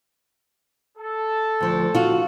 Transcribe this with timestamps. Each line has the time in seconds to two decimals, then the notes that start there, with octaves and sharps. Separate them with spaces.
0.97 A4
1.61 D2 F3
1.95 F4 F#4